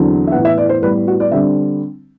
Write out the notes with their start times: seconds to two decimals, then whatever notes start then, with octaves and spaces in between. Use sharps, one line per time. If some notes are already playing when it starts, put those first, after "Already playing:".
Already playing: E2 D3 F#3 C4
0.27 E5
0.32 A2 E3 B3 F#5
0.45 E5
0.58 D5
0.69 C5
0.82 A2 G3 B3 B4
1.08 F#4
1.20 D5
1.32 D3 G3 C4 E5